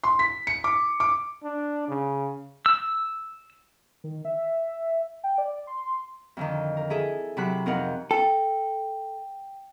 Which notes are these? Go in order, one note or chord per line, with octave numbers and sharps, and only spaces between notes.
C6
B6
C#7
D6
D6
D4
C#3
E6
D#3
E5
G5
D5
C6
F2 D3 D#3
A#4
E4 G#4 A4
C3 F#3 F#5 B5 F#6
F2 C4 D#4 A#4 F#5
A4 G5